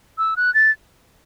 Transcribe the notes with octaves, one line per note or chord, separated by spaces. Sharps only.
E6
F#6
A6